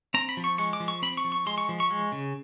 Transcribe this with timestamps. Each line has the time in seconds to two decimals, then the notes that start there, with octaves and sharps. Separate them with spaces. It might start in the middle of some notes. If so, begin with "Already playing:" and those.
0.14 C4 A#5
0.29 B5
0.37 F3
0.44 C#6
0.58 G#3 C#6
0.73 D6
0.80 F3
0.88 C#6
1.02 C4 B5
1.17 C#6
1.24 F3
1.32 C#6
1.46 G#3 C6
1.58 C#6
1.69 F3
1.80 C#6
1.90 G#3
2.12 C#3